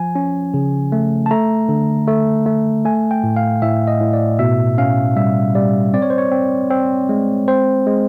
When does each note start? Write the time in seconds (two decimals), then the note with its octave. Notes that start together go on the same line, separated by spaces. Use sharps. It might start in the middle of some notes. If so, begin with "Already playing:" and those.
Already playing: F3 G#5
0.15 C#4
0.54 C#3
0.92 A3
1.26 A5
1.31 A3 A#5
1.69 D3
2.07 A3
2.46 A3
2.85 A3 G#5
3.11 G5
3.23 A2
3.36 F5
3.62 A2 E5
3.88 D#5
4.01 A2
4.13 D5
4.39 B2 E5
4.78 C#4 F5
5.16 G3 E5
5.55 G3 D5
5.94 C4 D5
6.02 C#5
6.10 C5
6.18 C#5
6.31 C4
6.70 C4
7.09 G#3
7.48 C4 C5
7.86 G#3